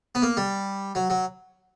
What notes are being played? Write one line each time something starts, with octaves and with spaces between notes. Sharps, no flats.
B3
A#3
G3
F#3
F#3